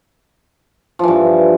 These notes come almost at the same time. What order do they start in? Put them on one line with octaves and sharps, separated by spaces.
F3 E3 G2